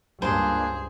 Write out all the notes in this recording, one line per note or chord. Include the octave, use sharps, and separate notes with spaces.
C#2 G2 A#3 D4 G#4 C5 G#5